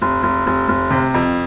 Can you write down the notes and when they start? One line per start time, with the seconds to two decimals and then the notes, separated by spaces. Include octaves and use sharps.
0.02 F1
0.23 F1
0.47 F1
0.69 F1
0.91 C3
1.14 F2